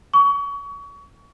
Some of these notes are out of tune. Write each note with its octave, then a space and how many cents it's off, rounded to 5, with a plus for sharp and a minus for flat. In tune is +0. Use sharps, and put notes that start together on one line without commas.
C#6 +30